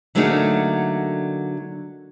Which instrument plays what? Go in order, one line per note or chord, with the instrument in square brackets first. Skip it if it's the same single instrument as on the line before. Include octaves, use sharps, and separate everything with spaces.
[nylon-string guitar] D3 F#3 A3 A#3 D#4 G#4